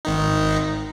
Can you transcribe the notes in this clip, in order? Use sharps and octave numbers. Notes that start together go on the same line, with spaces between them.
G#1 D#3 D#4